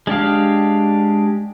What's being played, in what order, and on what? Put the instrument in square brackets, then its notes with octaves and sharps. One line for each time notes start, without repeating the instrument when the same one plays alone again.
[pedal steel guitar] G#3 D4 G4 F5